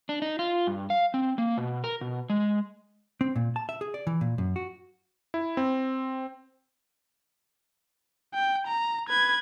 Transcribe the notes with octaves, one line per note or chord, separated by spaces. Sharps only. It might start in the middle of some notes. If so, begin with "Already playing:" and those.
D4
D#4
F4
G2
F5
C4
A#3
B2
A#4
B2
G#3
C4
A#2
A5
E5
G#4
D5
E3
A#2
F#2
F#4
E4
C4
G5
A#5
B4 G#6